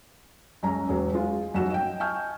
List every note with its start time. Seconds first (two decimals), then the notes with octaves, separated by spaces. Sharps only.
0.63 C#2 F#2 C#4 A#5
0.89 E1 F#3
1.14 G#3 F4
1.54 F1 F#2 F#4 E7
1.70 D#5 G5
2.00 G#5 A5 C#6 F6 G6